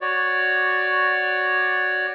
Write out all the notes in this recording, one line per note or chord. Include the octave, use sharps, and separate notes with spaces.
F#4 C#5 D5